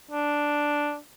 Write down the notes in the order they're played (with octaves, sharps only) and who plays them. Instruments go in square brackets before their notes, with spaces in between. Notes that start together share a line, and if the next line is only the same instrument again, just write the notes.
[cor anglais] D4